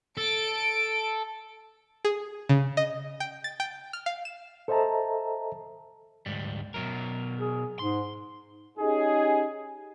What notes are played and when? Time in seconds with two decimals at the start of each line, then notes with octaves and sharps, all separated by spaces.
0.17 A4 D7
2.05 G#4
2.49 C#3
2.77 D#5
3.20 G5
3.44 A6
3.60 G5
3.93 F6
4.06 F5
4.25 E7
4.68 A4 C5 D#5 E5 A5 A#5
6.26 D2 G#2 G3
6.74 B2 F#3 A#4
7.39 G#4
7.79 G#2 C6
8.78 C#4 D#4 G4 G#4